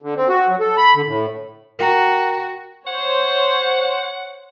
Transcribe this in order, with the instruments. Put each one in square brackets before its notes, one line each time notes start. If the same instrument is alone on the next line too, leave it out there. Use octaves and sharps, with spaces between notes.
[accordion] D3
C4
F#4
F#3
A4
B5
D3
A2
[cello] F#4 [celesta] A#4 G5 A#5
[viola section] C5 C#5 [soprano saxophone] F#5